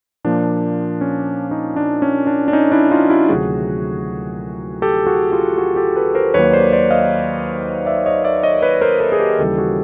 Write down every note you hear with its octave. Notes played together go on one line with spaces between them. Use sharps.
A#2 F3 A#3 D4
C#4
C#4 D#4
D4
C#4
D4
D4
C#4 D#4
D4 E4
D#4 F4
E4 F#4
D2 C3 D#3 F#3 A3 F#4 G#4
G4 A4
F#4 G#4
F4 G4
F#4 G#4
G4 A4
A4 B4
A#4 C5
D#2 D#3 F#3 A#3 B4 C#5
C5 D5
C5 D5
D#5 F5
D5 E5
C#5 D#5
D5 E5
C#5 D#5
B4 C#5
A#4 C5
A4 B4
G#4
G4 A4
D#2 C#3 E3 G3 G4 A4
F#4 G#4